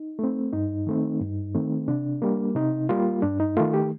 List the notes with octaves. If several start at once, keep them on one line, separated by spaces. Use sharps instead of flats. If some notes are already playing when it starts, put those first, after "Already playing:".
Already playing: D#4
A3 C4
G2 D#4
D#3 A3 C4
G2
D#3 A3 C4
C3 D4
G3 A#3
C3 D#4
G3 A#3 F4
G2 D4
D#4
D#3 A3 F4
G4